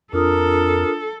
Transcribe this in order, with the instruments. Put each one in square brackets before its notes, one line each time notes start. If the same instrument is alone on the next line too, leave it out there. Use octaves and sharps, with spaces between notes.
[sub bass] F2 [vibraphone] D4 F4 D#6 [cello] A4 [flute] A#4